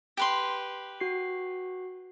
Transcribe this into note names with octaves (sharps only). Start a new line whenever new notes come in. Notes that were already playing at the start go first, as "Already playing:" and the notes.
G4 B4 C6
F#4 C7